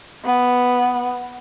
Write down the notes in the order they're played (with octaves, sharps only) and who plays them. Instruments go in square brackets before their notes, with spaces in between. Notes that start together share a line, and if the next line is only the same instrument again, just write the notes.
[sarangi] B3